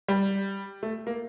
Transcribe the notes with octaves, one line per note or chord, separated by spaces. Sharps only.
G3
A3
A#3